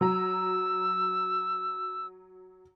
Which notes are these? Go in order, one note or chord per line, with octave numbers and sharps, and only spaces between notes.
F#3 A#5 E6